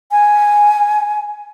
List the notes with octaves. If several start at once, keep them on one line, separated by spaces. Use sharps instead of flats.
G#5